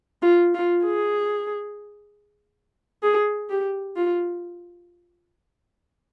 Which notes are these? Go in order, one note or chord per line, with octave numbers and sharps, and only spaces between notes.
F4
F4
G#4
G#4
G4
F4